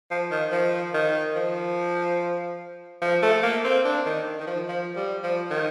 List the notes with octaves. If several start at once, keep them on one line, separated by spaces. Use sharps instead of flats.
F3
D#3
F3
D#3
F3
F3
A3
A#3
C4
D4
D#3
D#3
F3
F3
G3
F3
D#3